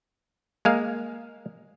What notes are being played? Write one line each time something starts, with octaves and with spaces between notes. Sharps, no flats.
G#3 A#3 F5